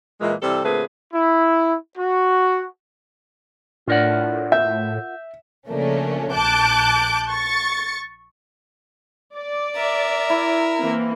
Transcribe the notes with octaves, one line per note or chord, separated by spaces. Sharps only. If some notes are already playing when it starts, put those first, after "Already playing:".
A#2 E3 G#3
C3 E3 G3 A4
A#2 D3 A3 C4 G#4 B4
E4
F#4
A2 D4 F4 A#4 D5 F#5
E5 G6
C#3 F3 A3 A#3 C#4 D4
A#1 A5 D6 F#6 G6
C#6 A6 C#7
D5
A#4 E5
E4
E3 A#3 C4